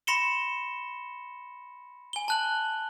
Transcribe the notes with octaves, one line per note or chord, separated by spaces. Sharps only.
B5 C6 A#6 C#7 E7 G7
G#5 G7
A5 F#6 F#7